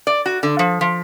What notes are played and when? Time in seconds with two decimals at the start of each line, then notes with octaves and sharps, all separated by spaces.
0.07 D5
0.26 F#4
0.43 D3
0.59 F3
0.81 F3